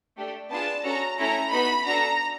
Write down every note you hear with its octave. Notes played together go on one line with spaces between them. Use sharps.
A3 D4 G4
B3 D4 F4 G#4 A5
C#4 F#4 A4 A#5
A3 C#4 E4 A4 A#5
B3 D#4 F#4 B5
D4 F#4 A4 A#5